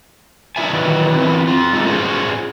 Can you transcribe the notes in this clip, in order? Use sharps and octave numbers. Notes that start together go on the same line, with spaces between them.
D4 D#4 F4 G#4 E5 G#5
D#3 E3 F#3
E3 B3 C4
C4 F4
G#3 A3 D#4 A4
C#4 F4 F#4 G#4 C5